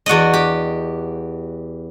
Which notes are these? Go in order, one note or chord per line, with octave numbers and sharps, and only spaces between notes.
E2 F#4 D5 D#5
G4